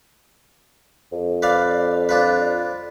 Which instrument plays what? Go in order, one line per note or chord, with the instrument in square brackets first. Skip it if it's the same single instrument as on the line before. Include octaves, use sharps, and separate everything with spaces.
[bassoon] F2
[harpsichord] B4 D5 F5
D4 F4 B4